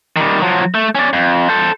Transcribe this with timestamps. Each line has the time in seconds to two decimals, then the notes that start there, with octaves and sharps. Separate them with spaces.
0.16 D#3 G3
0.41 F3 F#3
0.75 A3
0.95 C#4 D5
1.13 F2
1.49 A4 C5